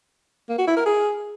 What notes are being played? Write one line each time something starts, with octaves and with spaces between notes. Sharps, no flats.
A#3
F#4
E4
A#4
G#4